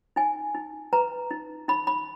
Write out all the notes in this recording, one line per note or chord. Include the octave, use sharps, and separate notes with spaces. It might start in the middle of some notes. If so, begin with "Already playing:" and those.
D#4 G#5
D#4
B4 A#5
D#4
D#4 B5
B5